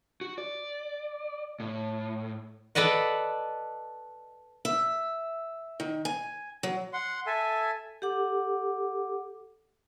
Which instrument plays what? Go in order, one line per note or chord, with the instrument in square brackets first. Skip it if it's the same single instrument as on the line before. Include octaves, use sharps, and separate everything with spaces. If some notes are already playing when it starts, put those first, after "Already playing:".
[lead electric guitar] F#4
D5
A2
[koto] A4 B4 D5 D#5 F#5
[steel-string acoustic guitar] E5
D#3
G#5
F#3
[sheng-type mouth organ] F#5 C6
A4 E5 G#5
[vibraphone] G4 A4 F#5 D6